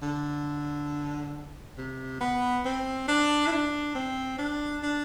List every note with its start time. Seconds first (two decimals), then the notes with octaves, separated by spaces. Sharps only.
0.02 D3
1.77 C3
2.21 B3
2.65 C4
3.08 D4
3.47 E4
3.52 D4
3.95 C4
4.38 D4
4.83 D4